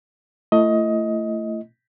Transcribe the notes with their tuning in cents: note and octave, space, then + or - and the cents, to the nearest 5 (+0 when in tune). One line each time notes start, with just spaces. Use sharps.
A3 +20 E4 +40 D#5 +20